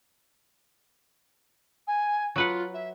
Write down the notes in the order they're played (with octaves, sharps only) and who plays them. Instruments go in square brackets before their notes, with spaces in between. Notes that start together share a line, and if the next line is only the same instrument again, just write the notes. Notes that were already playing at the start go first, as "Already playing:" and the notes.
[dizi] G#5
[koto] F#3 B4 F#5 [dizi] F4
[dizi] E5